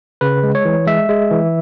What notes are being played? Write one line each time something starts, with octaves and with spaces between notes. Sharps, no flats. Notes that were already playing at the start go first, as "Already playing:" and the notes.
C#3 B4
G#3
C#5
E3
G#3 E5
G#3
E3